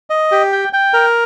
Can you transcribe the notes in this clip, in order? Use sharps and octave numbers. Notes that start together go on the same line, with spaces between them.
D#5
G4
G5
G5
A#4